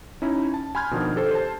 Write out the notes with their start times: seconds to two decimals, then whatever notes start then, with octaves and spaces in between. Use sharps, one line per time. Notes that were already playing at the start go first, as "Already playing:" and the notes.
0.22 C#4 D#4 E4
0.54 A5
0.75 G#5 B5 C6 F6 G6 G#6
0.91 B2 D#3 F3 D4
1.16 G4 A4 C5
1.31 C5 A5